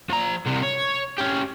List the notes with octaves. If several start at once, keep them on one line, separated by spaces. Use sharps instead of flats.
F3 A#5
C2 C3
C#5
C#4 G4